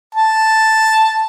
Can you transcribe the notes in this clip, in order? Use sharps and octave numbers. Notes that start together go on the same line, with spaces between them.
A5